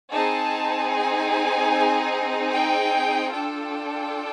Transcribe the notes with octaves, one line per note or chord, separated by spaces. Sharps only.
C4 D#4 G#4 A5
G#5
G5
D4 F4 A4 G5